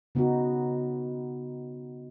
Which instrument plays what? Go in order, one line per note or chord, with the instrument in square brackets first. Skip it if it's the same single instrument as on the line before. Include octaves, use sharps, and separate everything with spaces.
[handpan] C#3 B3 D#4 F#4